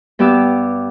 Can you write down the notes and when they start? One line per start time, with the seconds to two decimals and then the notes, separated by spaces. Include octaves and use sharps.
0.19 G2 B3 G4 D5 E6